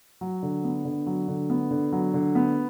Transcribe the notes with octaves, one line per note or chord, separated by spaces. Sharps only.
F#3
D3
B3
D3
F#3
D3
B3
D3
F#3
D3
B3